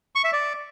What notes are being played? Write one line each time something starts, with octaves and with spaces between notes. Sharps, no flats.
C#6
E5
D5